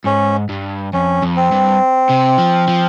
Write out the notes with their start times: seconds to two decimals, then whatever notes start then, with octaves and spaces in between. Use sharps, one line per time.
0.05 G#2 C#4
0.49 G2
0.93 F2 C#4
1.22 F2
1.36 C4
1.51 G2
2.10 C3
2.38 F3
2.68 F3